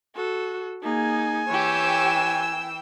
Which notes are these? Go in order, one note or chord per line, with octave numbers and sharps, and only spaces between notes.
F#4 A4
A#3 D#4 G#4 G#5
E3 G4 C#5 G5 E6